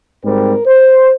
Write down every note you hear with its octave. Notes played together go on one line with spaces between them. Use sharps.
G#2 G3 C4 A#4
C5